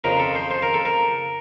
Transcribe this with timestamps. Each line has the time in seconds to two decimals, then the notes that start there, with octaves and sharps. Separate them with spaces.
0.04 F2 C#3 F3 A#4
0.20 A4
0.35 C5
0.51 C5
0.62 A#4
0.74 A4
0.85 A#4